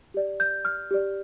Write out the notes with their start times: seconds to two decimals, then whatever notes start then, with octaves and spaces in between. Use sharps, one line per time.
0.14 G4 D5
0.40 G6
0.65 F6
0.91 G4 D5